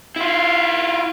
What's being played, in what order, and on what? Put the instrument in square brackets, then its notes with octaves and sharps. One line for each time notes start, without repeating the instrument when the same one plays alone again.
[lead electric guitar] E4 F4